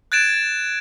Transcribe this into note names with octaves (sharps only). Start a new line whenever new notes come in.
F#6 G#6 A6 D7 E7